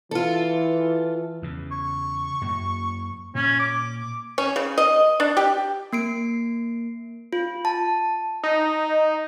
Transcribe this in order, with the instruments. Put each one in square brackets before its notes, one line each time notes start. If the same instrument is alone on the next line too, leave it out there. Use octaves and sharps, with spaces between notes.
[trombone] E3 [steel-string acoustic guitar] F4 A4
[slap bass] E2 C#3
[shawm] C#6
[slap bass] F#2 A#3
[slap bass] A#2 [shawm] C#4
[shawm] D6
[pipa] C#4
C#3
D#5
D4
G4
[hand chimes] A#3 C7 D7
F4
A5
[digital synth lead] D#4